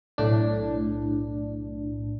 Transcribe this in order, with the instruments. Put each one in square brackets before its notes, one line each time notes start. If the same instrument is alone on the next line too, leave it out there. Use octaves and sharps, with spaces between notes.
[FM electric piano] B1 A2 D4